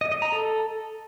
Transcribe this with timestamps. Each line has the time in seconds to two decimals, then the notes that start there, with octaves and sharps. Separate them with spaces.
0.01 D#5
0.12 D#5
0.22 A#5
0.32 A4